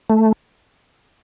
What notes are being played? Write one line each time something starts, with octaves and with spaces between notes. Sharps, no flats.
A3